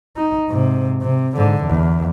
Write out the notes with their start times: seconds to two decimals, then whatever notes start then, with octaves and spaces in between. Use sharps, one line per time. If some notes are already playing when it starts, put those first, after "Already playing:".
0.16 D#4
0.49 G#2 C3
1.02 C3
1.36 G#2 D3
1.65 E2